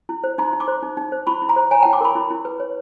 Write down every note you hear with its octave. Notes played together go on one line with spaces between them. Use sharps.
E4
C5
D#4 A#5 C6
D#4
C6 D6
C5
D#4
D#4
C5
E4 B5 C#6
E4
A#5 C6
C5
C#5 G#5 A#5
E4 G5 A5
C6 D6
A#4 B5 C#6
E4
E4
B4
C#5